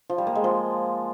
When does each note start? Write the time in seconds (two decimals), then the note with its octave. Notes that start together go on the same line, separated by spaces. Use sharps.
0.09 F3
0.18 G3
0.27 A#3
0.35 G#3
0.44 F3